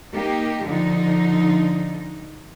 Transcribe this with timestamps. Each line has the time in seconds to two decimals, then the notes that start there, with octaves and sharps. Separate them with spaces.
0.13 A#3 D#4 G4
0.64 D3 F3 D#4